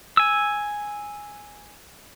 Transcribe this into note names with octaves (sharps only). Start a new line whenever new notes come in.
G#5 E6